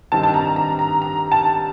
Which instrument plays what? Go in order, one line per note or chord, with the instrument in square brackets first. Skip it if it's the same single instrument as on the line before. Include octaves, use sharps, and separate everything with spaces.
[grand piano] G2 D#3 G3 C4 [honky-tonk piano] A5
[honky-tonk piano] A5
A#5
A#5
A#5
A#5
A5